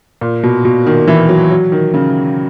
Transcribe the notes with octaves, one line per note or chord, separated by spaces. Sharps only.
A#2
B2
B2
D#3
E3
F#3
F#3
D#3
C#3